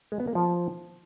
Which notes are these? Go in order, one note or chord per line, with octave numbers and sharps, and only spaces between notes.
G#3
B3
A#3
F3